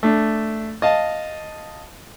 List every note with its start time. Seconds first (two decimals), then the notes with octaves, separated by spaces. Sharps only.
0.03 A3 D4
0.82 D#5 F5 A5